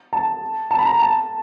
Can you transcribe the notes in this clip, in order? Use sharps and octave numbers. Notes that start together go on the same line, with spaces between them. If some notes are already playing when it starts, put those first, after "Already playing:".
A5
A5
B5
A#5
A5